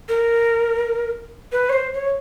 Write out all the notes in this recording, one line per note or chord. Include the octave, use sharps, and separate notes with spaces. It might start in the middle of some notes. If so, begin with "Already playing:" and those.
A#4
B4
C#5
C5
C#5